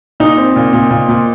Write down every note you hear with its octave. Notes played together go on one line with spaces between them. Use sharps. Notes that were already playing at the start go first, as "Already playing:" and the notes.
A#2 D#4
C4
A#2
A#2
A#2
A#2